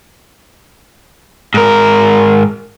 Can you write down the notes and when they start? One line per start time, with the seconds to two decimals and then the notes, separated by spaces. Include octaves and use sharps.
1.54 G#2 A#4